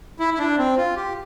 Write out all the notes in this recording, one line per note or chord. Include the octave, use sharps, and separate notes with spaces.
E4
E4
D4
C4
F4
G4